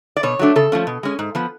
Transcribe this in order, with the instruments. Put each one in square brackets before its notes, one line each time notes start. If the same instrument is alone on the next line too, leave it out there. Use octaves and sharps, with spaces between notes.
[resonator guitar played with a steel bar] D5
B2 C#5
F#3 A3 D4
C#3 A4
F3 A3 C#4
B2
G#3 C#4
G#2
F3 B3